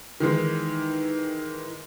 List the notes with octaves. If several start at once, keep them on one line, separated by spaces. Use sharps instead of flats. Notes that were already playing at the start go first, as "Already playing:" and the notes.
D#3 E3 G#3